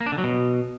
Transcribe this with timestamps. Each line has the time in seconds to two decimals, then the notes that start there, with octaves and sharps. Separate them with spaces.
0.01 A#3
0.06 D4
0.12 D3
0.18 F#3
0.24 B2